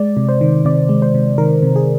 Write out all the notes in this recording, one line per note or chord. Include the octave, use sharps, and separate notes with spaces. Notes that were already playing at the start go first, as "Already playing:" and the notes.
Already playing: G#3 D5
C3
C5
D#3
C3 D5
G#3
C5
C3
D#3 A#4
C3
G#4